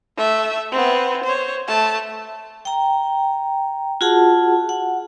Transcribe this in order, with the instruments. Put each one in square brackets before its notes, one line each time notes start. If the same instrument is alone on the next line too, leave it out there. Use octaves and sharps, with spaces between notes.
[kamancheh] A3 E5
B3 C4
C5 C#5
A3 A5
[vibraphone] G5 A#5
F4 F#4 G#4 F#5 A5
F#5